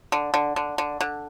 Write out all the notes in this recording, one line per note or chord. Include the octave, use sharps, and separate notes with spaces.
D3
D3
D3
D3
D3